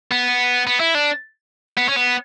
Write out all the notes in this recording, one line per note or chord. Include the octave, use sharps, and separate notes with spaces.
B3
B3
E4
D4
B3
C#4
B3